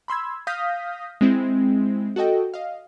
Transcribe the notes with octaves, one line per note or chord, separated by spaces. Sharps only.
B5 C6 E6 G#6
F5 D#6 F6 G6 A#6 B6
G#3 C4 E4
F#4 A4 D#5 G5
D#5 F5